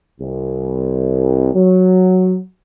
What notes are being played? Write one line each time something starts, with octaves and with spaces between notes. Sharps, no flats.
C2
F#3